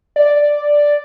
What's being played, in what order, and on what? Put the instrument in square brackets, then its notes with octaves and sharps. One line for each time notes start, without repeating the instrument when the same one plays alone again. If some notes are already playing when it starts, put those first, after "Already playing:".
[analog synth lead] D5